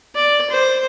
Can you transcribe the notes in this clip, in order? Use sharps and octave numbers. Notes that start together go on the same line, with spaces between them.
D5
C5